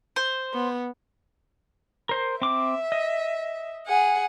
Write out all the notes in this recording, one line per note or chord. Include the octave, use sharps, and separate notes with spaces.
C5
B3
A#4 C5
C4 E5 D6
D#5
G#4 F#5